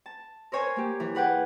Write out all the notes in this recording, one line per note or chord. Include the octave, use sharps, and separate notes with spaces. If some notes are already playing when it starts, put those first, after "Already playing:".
A5
A#4 C5 C#5 G#5
A#3 G4
E3
G#4 B4 F#5 G5